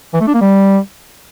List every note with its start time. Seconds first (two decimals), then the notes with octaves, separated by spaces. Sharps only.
0.14 E3
0.21 A3
0.27 D4
0.34 A#3
0.41 G3